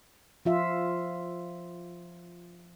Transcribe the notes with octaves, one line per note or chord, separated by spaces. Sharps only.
F3 F4 E5